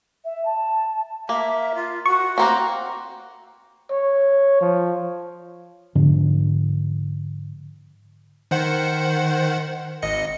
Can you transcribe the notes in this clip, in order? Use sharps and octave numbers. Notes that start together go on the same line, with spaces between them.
E5
A5
A#3 E5
F4
F#4 C#6
A#3 C4 F#4 A#5
C#5
F3
G#2 D3 F3
D#3 C5 F#5
G#1 D#5 C#7